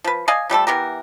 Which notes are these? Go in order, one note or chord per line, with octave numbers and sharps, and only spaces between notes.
F3 B4
D5 D#5 F5 G#5
F3 G3 A3 A4
E3 B3 G4 A#4